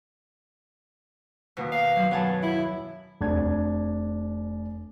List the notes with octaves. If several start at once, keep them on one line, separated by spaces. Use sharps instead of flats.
D#2 B2
F5
F#3
F#2 B3 G#5 A5
E4
F1 D4 G#6